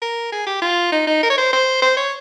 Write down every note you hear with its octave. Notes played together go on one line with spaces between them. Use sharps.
A#4
G#4
G4
F4
D#4
D#4
A#4
C#5
C5
C5
C5
C#5